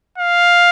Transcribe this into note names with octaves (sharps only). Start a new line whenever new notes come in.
F5